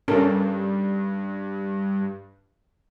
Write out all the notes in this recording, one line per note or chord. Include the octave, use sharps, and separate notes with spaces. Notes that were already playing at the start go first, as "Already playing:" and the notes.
G2 C#4 A4 A#4